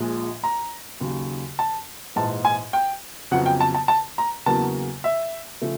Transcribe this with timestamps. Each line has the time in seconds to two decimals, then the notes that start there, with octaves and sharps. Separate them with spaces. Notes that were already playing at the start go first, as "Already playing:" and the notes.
Already playing: A#1 A#2 F3 G#3
0.44 A#5
1.00 D#2 C#3 F#3
1.59 A5
2.15 A#1 G#2 E3 A5
2.45 G#5
2.73 G5
3.31 F2 C#3 F#3 B3 F#5
3.46 G5
3.60 A5
3.74 A5
3.88 A5
4.18 A#5
4.46 E2 C#3 F#3 A#3 A5
5.04 E5
5.61 C#3 F3 A3